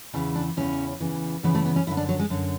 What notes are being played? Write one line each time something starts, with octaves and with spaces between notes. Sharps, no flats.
E2 C#3 E3
D4
E2 C#3 E3 C#4
E2 C#3 E3
E2 C#3 E3 B3
A3
B3
C#4
F#2 D3 E4
D4
F#3
G#3
F#2 D3